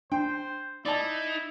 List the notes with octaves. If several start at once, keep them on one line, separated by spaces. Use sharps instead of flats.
D4 C5 G5
D#4 E4 D5 A5